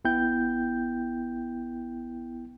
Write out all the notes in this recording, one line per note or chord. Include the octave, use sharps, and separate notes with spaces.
A1 B3 E4 G5 G6